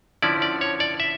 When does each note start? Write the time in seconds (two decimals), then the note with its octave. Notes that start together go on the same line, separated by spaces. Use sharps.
0.22 D3 F3 C#4 E4 D5
0.42 D5
0.61 C#5
0.80 D5
1.00 E5